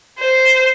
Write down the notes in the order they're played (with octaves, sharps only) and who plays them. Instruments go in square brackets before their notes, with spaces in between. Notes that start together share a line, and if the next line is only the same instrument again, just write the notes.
[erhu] C5